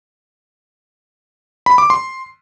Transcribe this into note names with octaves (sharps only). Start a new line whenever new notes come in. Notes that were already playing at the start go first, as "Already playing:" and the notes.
B5
D6
C6